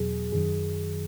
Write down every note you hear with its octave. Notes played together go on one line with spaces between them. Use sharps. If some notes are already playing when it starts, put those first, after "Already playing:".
Already playing: E2 B2 F#3 G#4
F#2 D#3 F#3 G#4